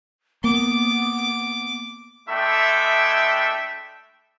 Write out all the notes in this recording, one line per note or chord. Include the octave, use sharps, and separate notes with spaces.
A#3 B3 D6
G#3 A3 D4 E4 E5 G5